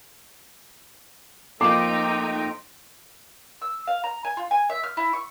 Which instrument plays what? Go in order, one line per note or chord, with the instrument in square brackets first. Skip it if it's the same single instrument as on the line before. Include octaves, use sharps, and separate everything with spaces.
[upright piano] F2 A#3 C7 [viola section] A3 D#4 G5 [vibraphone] C6 [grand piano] D6
[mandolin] E6
F5
A#5
G#5
F4
G#5
E5
F6
E4
C#6